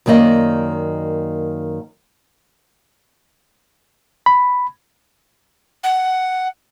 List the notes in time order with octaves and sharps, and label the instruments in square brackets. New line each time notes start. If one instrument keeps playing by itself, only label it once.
[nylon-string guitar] F#2 D#3 A#3 D5 D#5
[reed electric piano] B5
[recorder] F#5